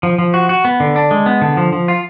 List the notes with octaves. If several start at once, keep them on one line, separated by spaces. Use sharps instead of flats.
F3
F3
F#4
F#4
B3
D3
D4
G#3
B3
D3
F3
F3
F4